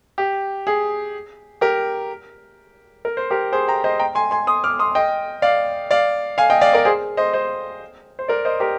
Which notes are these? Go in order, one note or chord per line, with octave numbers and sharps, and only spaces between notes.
G4
G#4
G4 A#4
A#4
C5
G4 A#4
G#4 C5
G5 A#5
C5 D#5
G5 A#5
G#5 C6
G#5 C6
C6 D#6
D6 F6
C6 D#6
D#5 G5
D5 F5
D5 F5
F5 G#5
D#5 G5
D5 F5
A#4 D5
G#4 C5
C5 D#5
C5 D#5
C5
A#4 D5
C5 D#5
G4 A#4